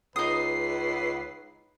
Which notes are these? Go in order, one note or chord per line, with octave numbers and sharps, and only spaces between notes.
C#2 D#4 B4 D#6 C7